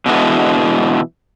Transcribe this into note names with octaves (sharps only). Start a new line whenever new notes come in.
B2 D3 E3 G#3 B3